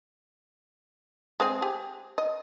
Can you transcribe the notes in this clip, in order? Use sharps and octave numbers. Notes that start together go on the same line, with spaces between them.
G#3 C4 G#4
G4 G#5
D#5